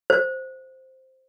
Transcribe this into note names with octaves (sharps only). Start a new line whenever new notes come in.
C5